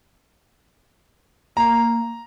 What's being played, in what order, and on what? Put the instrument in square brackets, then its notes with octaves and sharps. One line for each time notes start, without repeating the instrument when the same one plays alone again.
[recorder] A#3 [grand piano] A#5